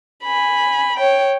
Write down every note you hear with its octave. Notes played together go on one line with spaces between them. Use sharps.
G#5 B5
C#5 G5